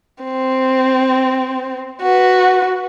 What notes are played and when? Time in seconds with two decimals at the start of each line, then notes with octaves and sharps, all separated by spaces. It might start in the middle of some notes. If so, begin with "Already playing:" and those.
0.23 C4
2.02 F#4 B4